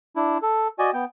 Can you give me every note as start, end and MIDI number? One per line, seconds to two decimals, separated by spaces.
0.16 0.38 62
0.16 0.38 64
0.42 0.68 69
0.79 0.91 66
0.79 0.91 74
0.79 0.91 75
0.79 0.91 80
0.93 1.05 59
0.93 1.05 79